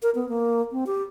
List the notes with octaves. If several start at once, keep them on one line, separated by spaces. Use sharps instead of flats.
A#4
B3
A#3
C4
G4